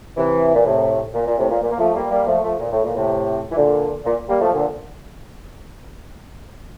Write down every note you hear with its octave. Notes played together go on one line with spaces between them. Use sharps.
C3 E3
A#2
A2 C3
A#2
A#2
A2 C3
A#2
A#2
A#3
F3 A3
G3 A#3
G3 A#3
F3 A3
F3 A3
A#2
A2
A#2
A2 C3
E3
A#2 D3
A#2
G3 A#3
F3 A3
A#2 D3